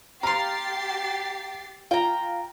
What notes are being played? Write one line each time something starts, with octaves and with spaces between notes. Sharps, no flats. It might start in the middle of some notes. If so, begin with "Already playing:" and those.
G4 F5 A#5 C6 A6 C7
F4 G5 A#5